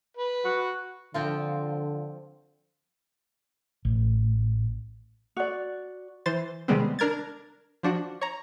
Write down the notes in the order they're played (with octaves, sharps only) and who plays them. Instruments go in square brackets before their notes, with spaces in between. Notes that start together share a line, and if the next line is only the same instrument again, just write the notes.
[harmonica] B4
[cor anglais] F#4
[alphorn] D3 [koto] F3 C4 F4
[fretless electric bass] A1
[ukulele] F#4 D5
[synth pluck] E3 C5 A6
C3 D#3 G3 G#3 B3 C4
D4 A#4 G#6 A6
F3 D4 F#4
C#5 A#5